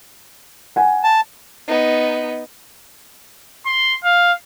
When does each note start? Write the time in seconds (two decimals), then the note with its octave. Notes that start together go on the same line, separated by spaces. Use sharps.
0.76 F#5 G#5
1.04 A5
1.68 B3 D#4
3.66 C6
4.04 F5